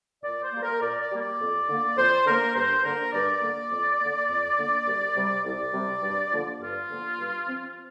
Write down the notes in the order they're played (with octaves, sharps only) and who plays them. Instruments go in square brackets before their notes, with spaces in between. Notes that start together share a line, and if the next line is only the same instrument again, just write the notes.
[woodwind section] A#2 D5
C5
G3 A#3
A#4
A#2 D5
D5
G3 A#3
D5
F2
D3 A#3
F2 C5
D3 A#3 A#4
G2 C5
D3 A#3 A#4
G2 D5
D3 A#3
F2
D3 A#3
F2
D3 A#3
C2
C3 G3
C2 D5
C3 G3
G2
D3 F3 A#3
G2 F4
D3 F3 A#3
G2
F3 C4